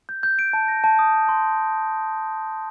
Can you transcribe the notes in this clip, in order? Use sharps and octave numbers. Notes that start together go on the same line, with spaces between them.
G6
G6
D7
A5
A#6
A5
D#6
D#6
C6